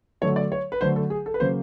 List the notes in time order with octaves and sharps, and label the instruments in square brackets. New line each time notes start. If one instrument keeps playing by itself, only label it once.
[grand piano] D3 F#3 A3 C#5
D5
C#5
B4
D3 F#3 A3 C5
A4
G#4
A4
B4
C#3 F#3 A#3 C#4 C5